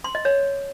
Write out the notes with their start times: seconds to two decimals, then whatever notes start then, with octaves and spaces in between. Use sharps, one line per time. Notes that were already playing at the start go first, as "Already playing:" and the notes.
0.04 C6
0.15 D#5
0.25 C#5